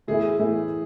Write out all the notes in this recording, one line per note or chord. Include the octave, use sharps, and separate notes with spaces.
A2 E3 A3 E4 G#4
A2 E3 A3 E4